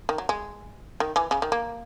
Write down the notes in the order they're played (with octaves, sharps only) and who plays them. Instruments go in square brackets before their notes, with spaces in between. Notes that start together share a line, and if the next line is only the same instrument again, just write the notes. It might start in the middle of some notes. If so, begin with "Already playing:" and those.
[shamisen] D#3
F#3
G#3
D#3
E3
C#3
D#3
A#3